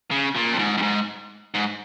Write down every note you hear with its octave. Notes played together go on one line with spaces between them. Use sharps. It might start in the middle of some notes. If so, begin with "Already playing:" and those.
C#3
A#2
F2
G#2
F2
G#2
G#2